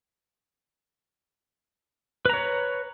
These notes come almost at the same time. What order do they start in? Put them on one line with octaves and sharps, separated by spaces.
B4 A#5 C#5